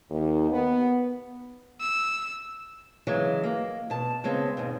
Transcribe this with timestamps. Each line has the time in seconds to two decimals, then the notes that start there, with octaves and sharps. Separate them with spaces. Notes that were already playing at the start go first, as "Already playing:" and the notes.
0.10 D#2
0.50 B3
1.81 E6
3.07 C#3 E3 F#3 G#3
3.43 A#3
3.90 B2 A5
4.24 C#3 G#3 B3 C4
4.57 D#2 G#2 B2